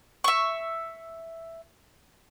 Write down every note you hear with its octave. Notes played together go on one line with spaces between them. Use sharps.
E5 C#6